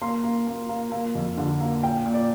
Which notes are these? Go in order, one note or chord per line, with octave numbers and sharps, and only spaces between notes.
A#3 C6
A#3
A#3
A#3
A#3
F2
D3
A#3
A#2 G5
A#2
D5